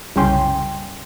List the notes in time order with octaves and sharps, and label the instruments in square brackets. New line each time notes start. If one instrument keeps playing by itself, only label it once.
[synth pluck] C2 F#2 C#3 C#4 G5 C6